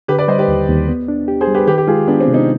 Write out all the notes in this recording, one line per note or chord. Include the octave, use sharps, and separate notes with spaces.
D3 G4 B4
B4 D5
G3 C5 D#5
G4 B4
D#2
D#2
B3
D4
G4
G#4 C5
G3
G4 B4
D#3 G4 B4
G4
G#3 F4 G#4
B3 D4
C4
C3
C4 D#4